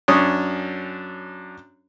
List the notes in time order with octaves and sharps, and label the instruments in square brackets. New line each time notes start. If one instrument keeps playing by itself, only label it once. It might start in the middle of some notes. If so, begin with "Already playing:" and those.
[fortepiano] F#2 C#4 D4 C#5 D#6